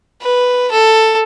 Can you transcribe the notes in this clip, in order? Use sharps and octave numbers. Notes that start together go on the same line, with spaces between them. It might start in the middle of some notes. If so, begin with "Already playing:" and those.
B4
A4